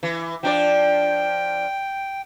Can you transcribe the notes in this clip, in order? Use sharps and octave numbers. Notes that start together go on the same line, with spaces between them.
E3
F3 D4 D5 G5